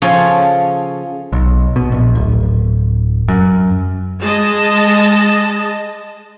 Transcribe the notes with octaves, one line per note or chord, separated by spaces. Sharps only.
C#3 F3 C#4 A4 C#5
B1
B2
A#1
D1
F#2
G#3 D#5 A5